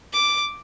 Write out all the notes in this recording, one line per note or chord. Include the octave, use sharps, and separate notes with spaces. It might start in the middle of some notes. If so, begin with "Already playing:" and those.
D6